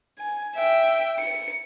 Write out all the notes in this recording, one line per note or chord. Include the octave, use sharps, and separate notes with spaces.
G#5
E5 G5
C#7